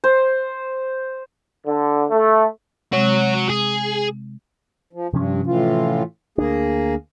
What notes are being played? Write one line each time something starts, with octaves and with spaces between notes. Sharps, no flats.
C5
D3
A3
C3 G#3 C4 F#4 C#5
G#4
F3
G2 C3 F3 C#4
A2 E3 F4
D2 A#3 D4 G#4